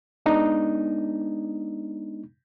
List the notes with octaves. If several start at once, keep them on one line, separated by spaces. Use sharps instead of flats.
G#3 B3 D4 D#4